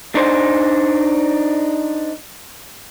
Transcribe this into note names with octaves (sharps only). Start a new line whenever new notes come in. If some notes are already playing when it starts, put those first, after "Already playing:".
D4 D#4 C5